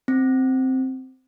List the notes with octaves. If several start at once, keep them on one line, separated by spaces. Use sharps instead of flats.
C4